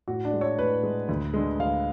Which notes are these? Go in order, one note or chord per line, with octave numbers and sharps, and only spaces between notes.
A2 F#4
D4
G#3
C#5
A2 B4
G#3
D2
D3 G#3
D2 F5